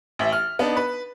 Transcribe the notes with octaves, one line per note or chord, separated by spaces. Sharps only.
A1 E5
F6
B3 D4 D#4
B4